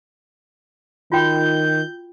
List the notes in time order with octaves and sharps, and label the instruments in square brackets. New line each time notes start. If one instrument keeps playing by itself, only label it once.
[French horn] D#3 [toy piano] F4 F#4 G5 [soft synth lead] G6